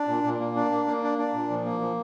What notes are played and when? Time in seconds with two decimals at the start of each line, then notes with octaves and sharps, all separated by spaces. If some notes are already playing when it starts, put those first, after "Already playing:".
Already playing: D4
0.08 A#2
0.24 A#2
0.40 A#3
0.56 D4
0.71 A#3
0.87 A#3
1.03 D4
1.18 D4
1.34 A#2
1.50 F3
1.65 A#3
1.80 F3